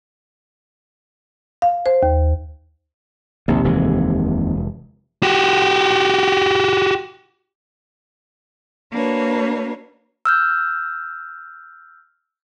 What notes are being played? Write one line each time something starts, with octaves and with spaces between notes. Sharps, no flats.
F5
C5
D#2
A#1 D#2 C3
F1 E3 G#3
F#4 G4
A#3 D4 F#4 B4 C#5
E6 F6 G6